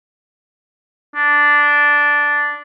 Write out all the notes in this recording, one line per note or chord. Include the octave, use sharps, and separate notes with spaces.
D4